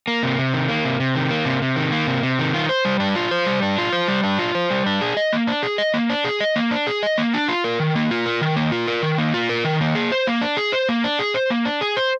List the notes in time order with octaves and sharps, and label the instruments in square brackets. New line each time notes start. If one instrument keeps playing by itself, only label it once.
[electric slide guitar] A#3
C3
C3
D#3
A#3
C3
C3
D#3
A#3
C3
C3
D#3
A#3
C3
C3
D#3
F4
C5
G3
D4
F4
C5
G3
D4
F4
C5
G3
D4
F4
C5
G3
D4
G#4
D#5
A#3
D4
G#4
D#5
A#3
D4
G#4
D#5
A#3
D4
G#4
D#5
A#3
D4
F4
A#4
D#3
A#3
F4
A#4
D#3
A#3
F4
A#4
D#3
A#3
F4
A#4
D#3
A#3
G#4
C5
A#3
D4
G#4
C5
A#3
D4
G#4
C5
A#3
D4
G#4
C5